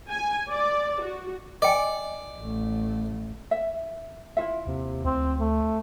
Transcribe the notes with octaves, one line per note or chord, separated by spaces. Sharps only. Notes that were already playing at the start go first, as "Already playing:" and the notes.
G#5
D5
F#4
D5 D#5 G5 G#5
A1 A3
E5
E4 F4 E5
D#2 C3
D2 C4
A3